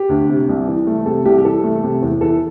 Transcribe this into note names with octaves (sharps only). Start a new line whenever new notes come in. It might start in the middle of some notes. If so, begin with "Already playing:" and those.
Already playing: G4
D2
C3
C2
E3
A3
C3 A4
C2 G4
G4
E3 A4
A3
C3
E2
E3 A4